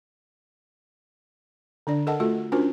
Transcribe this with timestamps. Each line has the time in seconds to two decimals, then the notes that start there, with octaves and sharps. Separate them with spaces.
1.87 D3 D4 D5
2.07 A4 A#4 D#5 F#5 A5
2.20 A3 F4 F#4 A4
2.52 C#4 D4 F4 F#4 A#4 C5